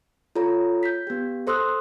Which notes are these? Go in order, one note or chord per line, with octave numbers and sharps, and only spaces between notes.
F4 A4 C#5 A#5
G6 B6
B3 G4
A4 C5 C6 D#6 E6 F#6